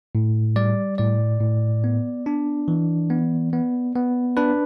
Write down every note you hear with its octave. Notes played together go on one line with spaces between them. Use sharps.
A2
G3 D5
A2 D5
A2
B3
D4
E3
B3
B3
B3
D4 B4